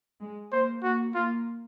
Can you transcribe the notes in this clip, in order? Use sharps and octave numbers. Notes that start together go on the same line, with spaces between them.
G#3
A#3 C5
A#3 F#4
A#3 F4